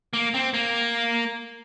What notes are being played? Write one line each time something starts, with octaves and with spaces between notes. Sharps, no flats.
A#3
C4
A#3